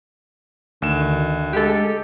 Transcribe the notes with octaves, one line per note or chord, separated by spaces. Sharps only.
D2 D#3 E7
G#3 G4 A4